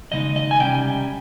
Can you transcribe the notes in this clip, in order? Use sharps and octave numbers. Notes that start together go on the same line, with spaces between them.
D#2 C#3 G#3 D#4 D#5
D#5
G#5
C3 G3 C#4 G5